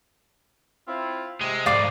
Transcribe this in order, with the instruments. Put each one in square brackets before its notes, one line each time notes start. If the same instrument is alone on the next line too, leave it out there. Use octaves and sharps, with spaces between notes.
[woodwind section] C4 E4 F4
[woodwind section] C3 [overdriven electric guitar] G#3
[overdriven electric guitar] F2 G#2 [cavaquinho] D5 F5 D6